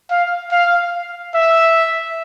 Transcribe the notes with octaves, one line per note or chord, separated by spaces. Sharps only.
F5
F5
E5